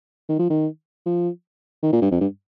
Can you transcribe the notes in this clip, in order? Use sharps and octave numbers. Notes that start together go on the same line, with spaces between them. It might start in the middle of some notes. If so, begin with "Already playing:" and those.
D#3
F3
D#3
F3
D#3
A#2
G2
F2
G2